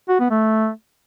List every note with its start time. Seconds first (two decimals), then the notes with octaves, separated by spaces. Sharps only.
0.09 F#4
0.20 B3
0.31 A3